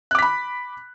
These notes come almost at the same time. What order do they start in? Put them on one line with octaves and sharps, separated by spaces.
F#6 D6 B6 B5